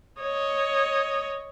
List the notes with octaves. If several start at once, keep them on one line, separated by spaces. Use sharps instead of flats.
C#5 D#5